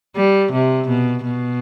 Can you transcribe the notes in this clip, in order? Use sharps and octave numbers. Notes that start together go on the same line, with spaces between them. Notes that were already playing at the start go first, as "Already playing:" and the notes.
G3
C3
B2
B2